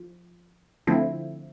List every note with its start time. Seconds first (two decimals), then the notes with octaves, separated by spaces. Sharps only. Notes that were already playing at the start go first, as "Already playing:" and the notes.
Already playing: F3
0.87 D3 F3 A3 C4 E4